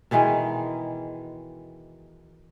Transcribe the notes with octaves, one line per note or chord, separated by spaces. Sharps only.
B2 D#3 E3 G#3